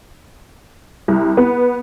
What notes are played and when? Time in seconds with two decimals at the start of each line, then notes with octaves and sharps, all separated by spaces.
1.08 C2
1.37 B3